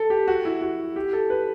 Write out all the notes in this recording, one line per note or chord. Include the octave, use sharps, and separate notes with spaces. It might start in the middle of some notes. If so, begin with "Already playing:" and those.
Already playing: A4
G4
F#4
E4
F#4
G4
A4
B4